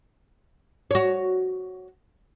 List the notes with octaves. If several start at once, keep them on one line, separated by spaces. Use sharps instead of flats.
F#4 C#5